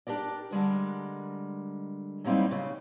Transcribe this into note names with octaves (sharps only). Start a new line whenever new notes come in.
D4 G4 A#4 D5
D3 G3 G#3 A#4
F#3 G3 A#3 C4 D#4 E4
C#3